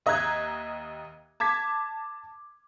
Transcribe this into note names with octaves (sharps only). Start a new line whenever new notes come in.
D#2 D#5 E5 A#5 F#6 G#6
A5 D6 G#6 B6